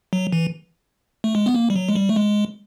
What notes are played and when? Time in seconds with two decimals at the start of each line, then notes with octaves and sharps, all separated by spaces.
0.13 F#3
0.32 E3
1.24 A3
1.35 G#3
1.46 B3
1.55 A#3
1.70 G3
1.76 F#3
1.89 G#3
1.95 G3
2.09 A3
2.16 G#3